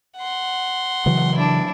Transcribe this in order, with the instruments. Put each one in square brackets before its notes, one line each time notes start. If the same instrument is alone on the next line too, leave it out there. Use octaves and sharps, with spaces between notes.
[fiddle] F#5 C6
[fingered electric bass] C#3 E3 F#3
[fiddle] D4 E4